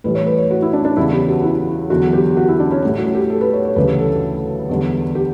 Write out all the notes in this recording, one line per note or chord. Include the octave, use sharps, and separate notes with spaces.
A2 E3 G3 B4
C#5
B4
C#5
F#4
E4
D4
D4
E2 C#3 G3 E4
G4
F#4
E4
E2 D3 F#3 F#4
G4
F#4
E4
D4
C#4
A2 G3 C#4
F#4
G4
A4
B4
C#5
C#5
D2 C#3 E3 G3 B4
A4
E2 D3 G3
G4